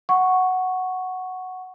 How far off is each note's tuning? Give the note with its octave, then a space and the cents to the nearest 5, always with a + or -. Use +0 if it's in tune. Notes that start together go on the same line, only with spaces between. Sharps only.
F#5 +0 C#6 +0